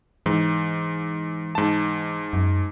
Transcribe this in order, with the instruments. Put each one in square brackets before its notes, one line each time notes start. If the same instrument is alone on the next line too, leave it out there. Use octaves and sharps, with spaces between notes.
[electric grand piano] G#2 [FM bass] E3
[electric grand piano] G#2 A5
[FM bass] F#2